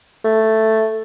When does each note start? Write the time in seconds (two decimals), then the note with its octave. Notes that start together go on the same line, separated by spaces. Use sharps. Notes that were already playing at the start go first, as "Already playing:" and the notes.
0.25 A3